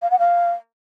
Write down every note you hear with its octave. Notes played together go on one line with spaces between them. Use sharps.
F5
F#5
F5